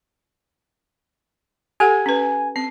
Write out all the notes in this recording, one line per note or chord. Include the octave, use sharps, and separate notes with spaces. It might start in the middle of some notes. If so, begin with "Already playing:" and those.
G4 A4 F#5 G#5
C#4 B4
C4 C7